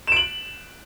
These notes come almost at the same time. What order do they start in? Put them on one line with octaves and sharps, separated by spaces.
E7 D7 F#7